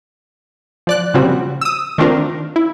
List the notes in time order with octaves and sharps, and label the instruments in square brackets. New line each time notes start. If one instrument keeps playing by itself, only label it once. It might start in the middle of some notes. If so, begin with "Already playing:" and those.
[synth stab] F3 D5 F#6
A#2 C#3 F3 G3 C4 F#4
D#6 E6
D#3 A3 C4 D4 F4 A#4
E4